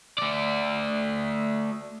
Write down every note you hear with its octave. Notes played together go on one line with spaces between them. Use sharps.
A3 D5